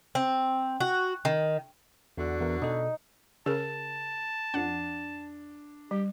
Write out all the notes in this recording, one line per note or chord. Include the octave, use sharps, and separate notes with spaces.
C4
F#4
D#3
E2 D3 F#4
E2 A#4
B2 D#4 A4
C#3 G#4 A#4 A5
F2 D4 F#5
G3 G4